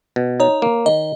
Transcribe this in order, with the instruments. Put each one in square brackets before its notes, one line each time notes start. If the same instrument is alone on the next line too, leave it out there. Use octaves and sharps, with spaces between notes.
[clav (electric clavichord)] B2
[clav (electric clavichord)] D#4 [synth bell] C#5
[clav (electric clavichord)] A#3
[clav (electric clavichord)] D#3 [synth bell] D#5